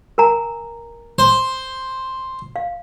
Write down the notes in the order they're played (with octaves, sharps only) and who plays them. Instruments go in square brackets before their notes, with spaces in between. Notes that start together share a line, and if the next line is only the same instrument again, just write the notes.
[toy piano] A#4 G#5 A#5
[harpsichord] C5
[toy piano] F5